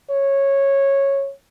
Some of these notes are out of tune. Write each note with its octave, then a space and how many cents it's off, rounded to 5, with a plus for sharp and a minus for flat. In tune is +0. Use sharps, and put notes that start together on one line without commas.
C#5 -10